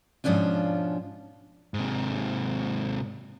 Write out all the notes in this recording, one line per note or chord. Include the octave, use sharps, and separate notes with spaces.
G#2 B2 F3 C#4 D4 F4
G#2 C3